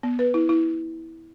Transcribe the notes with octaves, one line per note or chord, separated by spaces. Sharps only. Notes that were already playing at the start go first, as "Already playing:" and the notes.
B3
B4
E4
E4